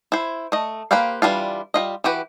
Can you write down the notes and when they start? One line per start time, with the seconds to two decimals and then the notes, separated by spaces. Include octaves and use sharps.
0.12 E4 C5
0.52 A3 D#5
0.91 A#3 G4 B4 C5 F5
1.22 E3 G3 D4 F4
1.74 G3 F4 D#5
2.04 E3 F#4 G4 B4